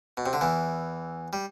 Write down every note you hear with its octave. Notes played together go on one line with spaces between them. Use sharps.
B2
C3
D3
E2 E3
G3